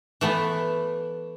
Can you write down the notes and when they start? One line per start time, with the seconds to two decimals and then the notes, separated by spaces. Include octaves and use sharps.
0.21 E3 A3 B3